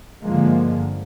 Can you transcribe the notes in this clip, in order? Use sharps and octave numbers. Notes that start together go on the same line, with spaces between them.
G1 D3 F3 G#3 A#3